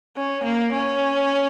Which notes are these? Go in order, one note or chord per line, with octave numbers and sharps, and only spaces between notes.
C#4
A#3
C#4